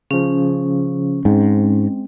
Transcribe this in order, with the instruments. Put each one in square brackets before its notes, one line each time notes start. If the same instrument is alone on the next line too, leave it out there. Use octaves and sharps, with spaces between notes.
[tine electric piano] C#3 F3 [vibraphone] C#4
[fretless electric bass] G#2 [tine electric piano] G#3 C4